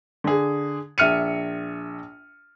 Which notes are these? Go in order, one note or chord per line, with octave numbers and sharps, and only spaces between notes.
D3 G#4
A#1 E5 F6 C#7 D#7